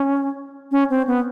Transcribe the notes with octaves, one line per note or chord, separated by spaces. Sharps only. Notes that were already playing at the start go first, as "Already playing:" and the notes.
Already playing: C#4
C#4
C4
B3